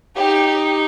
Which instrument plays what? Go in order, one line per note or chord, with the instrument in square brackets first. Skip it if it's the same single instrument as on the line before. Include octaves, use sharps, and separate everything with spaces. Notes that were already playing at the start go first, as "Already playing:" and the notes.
[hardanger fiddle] D#4 [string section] G4